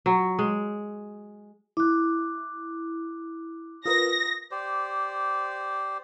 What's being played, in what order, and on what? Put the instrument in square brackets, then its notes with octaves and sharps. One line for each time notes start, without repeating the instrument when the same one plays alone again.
[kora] F#3
G#3
[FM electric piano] E4 [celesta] D6 F#6
[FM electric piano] F4 A#4 B4 [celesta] D#6 [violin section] A#6
[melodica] G4 C5 D5